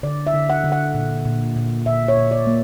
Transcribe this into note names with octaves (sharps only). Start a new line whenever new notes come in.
D3 D5
E5
D3
F#5
D3
F#5
A#2
A#2
A#2
A#2 E5
C#5
A#2
D5
A#3